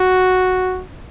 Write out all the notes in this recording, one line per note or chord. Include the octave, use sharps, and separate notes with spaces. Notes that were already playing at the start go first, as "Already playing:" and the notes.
Already playing: F#4